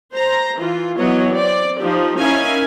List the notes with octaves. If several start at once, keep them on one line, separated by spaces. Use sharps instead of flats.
C5 A#5
E3 F4
E3 F#3 B3 C#5 D#5
C4 D5
F3 D#4 G4
C#4 D#4 E4 A#4 F5 G#5